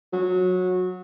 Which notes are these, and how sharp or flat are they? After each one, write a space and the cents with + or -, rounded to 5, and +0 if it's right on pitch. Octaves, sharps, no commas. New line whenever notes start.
F#3 -20